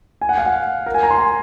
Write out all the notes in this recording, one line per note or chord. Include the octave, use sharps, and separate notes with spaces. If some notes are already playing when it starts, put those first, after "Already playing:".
G#5
F#5
F5
F#5
A#4
G#5
A#5
C6
G#5